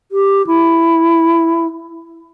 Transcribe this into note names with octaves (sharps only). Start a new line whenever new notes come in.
G4
E4